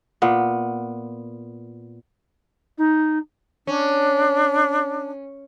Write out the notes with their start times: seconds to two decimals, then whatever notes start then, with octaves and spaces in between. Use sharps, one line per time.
0.22 A#2 B3
2.78 D#4
3.67 C#4 D4